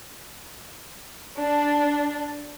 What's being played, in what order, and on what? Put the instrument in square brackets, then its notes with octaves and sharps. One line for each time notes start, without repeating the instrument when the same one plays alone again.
[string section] D4